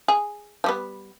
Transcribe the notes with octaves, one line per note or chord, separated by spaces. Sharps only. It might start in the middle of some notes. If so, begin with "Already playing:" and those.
G#4
F3 G3 B3